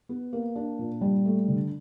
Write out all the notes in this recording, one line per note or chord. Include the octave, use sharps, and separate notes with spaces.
B3
A#3
D4
A#2
G3
A3
D3